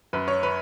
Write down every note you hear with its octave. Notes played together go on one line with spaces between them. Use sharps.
F#2 B4
C#5
B4